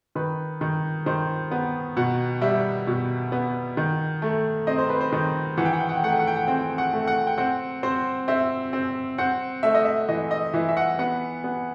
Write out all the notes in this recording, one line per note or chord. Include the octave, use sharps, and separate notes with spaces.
D#3 B4
D#3
D#3 C5
B3
B2 F#5
G3 E5
B2
B3
D#3
A3
C4 D#5
C5
B4
C5
D#3
E3 F#5
G5
F#5
G5
F#5
G5
A3 F#5
G5
F#5
G5
F#5
C4 G5
F#5
A3
F#5
G5
C4 F#5
C4 C5
C4 E5
C4
C4 F#5
A3 E5
D#5
E5
E3 D#5
D#5
E3 E5
E5
F#5
B3 F#5
B3